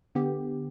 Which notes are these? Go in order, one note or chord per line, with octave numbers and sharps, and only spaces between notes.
D3 B3 G4